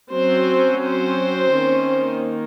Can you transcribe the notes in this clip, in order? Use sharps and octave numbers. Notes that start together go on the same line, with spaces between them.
F#3 C4 C#4 C5
C4 C5
D#3 A#3 C#4